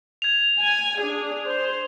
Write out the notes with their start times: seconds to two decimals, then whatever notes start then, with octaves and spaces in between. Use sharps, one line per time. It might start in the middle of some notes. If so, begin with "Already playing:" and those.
0.22 G#6 F7
0.60 G#5
1.01 D4 G#4
1.47 C5